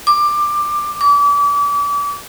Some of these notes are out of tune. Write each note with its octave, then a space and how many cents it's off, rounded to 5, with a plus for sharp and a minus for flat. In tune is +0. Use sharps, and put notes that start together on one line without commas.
D6 +15
D6 -35